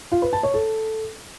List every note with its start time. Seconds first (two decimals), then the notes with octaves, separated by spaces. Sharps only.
0.12 F4
0.22 B4
0.33 A5
0.43 C#5
0.54 A4